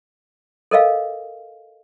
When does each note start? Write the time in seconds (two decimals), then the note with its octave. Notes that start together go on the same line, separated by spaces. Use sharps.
0.71 A4 A#4 D#5 F5